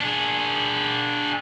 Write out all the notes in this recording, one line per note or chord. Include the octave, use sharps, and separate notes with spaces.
D4 G#4